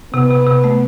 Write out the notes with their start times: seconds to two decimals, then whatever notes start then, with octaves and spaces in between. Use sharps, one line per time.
0.14 C3 B3
0.30 C3
0.47 C3
0.64 A3